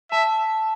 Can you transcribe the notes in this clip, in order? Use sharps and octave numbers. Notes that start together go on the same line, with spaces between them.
E5 A5